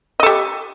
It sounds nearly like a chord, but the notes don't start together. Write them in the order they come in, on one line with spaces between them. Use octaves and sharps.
D#5 A4 G4